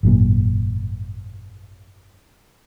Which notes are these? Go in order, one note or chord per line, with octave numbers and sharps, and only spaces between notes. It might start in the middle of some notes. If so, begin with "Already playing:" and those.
G#1 F#2 A#2